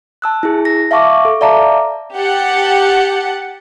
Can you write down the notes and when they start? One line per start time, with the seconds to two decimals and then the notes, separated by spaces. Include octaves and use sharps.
0.22 A5 E6 F#6
0.43 E4 G#4
0.65 A#6
0.91 E5 F5 A5 C#6 D6
1.25 A4
1.41 D5 E5 F5 A5 A#5 D6
2.16 G4 F#5 A5